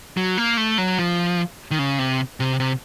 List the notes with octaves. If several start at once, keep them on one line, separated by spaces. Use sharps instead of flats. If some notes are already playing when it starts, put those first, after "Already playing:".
F#3
A#3
A3
F#3
F3
D#3
C#3
C3
C3
C3